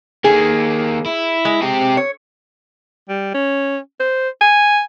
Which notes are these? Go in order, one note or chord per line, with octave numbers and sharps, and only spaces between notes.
D#3 A#3 G#4
E4
G#3
C4 G4
C#5
G3
C#4
C5
G#5